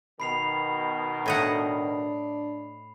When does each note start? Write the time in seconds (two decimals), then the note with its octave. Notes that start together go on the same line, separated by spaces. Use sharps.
0.20 B2 D#3 B5 C7 F7
1.26 A2 D4 D#5 F#5